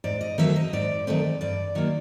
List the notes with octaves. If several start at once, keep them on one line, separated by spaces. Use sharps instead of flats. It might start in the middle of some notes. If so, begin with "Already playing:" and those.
G#2 D5
D#5
D#3 F#3 A3 C4 E5
D#5
G#2 D5
D#3 F#3 A3 C4 D5
G2 D5
D#3 F#3 A#3